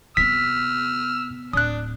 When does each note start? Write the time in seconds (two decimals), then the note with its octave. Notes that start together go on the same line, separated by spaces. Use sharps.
0.17 C3 B3 E6 F6 B6
1.53 D1 D4 D#6 F#6